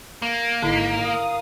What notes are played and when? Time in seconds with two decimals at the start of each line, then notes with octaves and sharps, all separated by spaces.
0.22 A#3
0.63 G#1 D3 D#4 E4 B6
1.00 A#4 F5 D#6